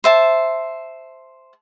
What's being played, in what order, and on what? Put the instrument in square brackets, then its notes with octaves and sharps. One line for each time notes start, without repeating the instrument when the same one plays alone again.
[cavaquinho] C5 E5 A5